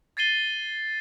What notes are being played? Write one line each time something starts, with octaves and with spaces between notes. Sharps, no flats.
G#6 A6 C7 D#7 G7